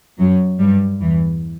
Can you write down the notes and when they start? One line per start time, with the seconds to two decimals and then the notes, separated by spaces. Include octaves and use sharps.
0.19 F#2 F#3
0.59 G2 G3
1.01 E2 E3